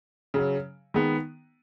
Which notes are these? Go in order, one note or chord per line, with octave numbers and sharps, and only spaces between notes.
C#3 F#3 C#4
D#3 G#3 B3